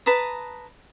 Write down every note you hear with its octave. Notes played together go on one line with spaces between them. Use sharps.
B4 A5 A#5 D#6